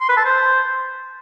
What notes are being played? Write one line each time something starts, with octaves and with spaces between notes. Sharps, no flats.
C6
B4
A5
C5